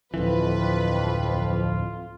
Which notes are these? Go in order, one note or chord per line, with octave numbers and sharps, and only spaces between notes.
D1 F2 E3 F4 B4